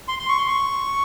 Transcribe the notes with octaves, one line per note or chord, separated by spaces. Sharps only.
C6
C6
C#6
C6
C#6